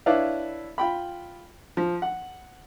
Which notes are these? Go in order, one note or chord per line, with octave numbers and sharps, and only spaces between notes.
D4 E4 B4 C#5 D5 F5
F4 G5 B5
F3
F#5